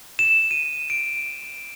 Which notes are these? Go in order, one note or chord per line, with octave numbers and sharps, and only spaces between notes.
E7
D#7
D7